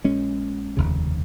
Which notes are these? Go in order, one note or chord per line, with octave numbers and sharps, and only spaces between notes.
A#1 A#2 G#3 C#4
F1 D#2 C#3